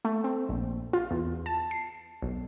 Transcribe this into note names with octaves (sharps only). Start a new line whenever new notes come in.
A3
C4
A#1
F4
E2
A5
C7
B1